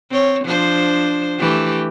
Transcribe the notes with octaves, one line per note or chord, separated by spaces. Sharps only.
C4 C#5
F3 D4 C5
E3 A3 G4